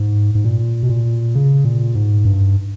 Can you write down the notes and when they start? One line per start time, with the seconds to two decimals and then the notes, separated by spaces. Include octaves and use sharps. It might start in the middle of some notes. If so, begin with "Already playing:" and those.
Already playing: G#2
0.35 G#2
0.44 A#2
0.83 B2
0.89 A#2
1.35 C#3
1.65 A#2
1.94 G#2
2.25 G2